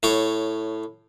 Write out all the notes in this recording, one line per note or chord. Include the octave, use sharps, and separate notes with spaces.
A2 C#5 D6